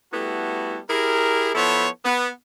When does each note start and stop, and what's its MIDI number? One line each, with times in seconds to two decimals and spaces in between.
0.13 0.79 55
0.13 0.79 57
0.13 0.79 59
0.13 0.79 64
0.13 0.79 66
0.13 0.79 69
0.89 1.50 64
0.89 1.50 67
0.89 1.50 68
0.89 1.50 70
1.55 1.88 53
1.55 1.88 59
1.55 1.88 64
1.55 1.88 69
1.55 1.88 72
1.55 1.88 73
2.05 2.29 59